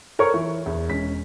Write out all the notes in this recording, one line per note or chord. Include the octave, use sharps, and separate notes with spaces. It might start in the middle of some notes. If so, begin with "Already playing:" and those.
A4 A#4 C5 C#5 C#6
E3
E2
E1 C#4 B6